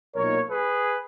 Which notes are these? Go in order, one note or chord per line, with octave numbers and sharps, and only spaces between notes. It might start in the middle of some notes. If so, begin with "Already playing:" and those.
B1 A#2 A#3 D#4 A#4 C#5
G#4 B4